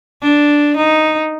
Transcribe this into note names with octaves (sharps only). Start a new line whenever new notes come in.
D4
D#4